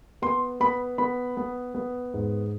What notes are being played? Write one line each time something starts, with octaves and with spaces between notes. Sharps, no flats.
B3 C6
B3 B5
B3 B5
B3
B3
G#2